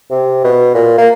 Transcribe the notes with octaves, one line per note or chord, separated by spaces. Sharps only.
C3
B2
A#2
A#3